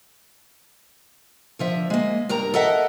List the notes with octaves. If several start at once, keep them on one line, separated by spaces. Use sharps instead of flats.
D3 F3 E5
G#3 A#3
G2 A#4 A#5
A4 A#4 D#5 E5 F#5